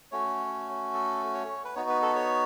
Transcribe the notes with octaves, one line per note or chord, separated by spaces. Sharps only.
A3 C#4 F#4 C#5
A4
C#5
B4
B3 D#4 F#4 C#5
B4
A4
C#5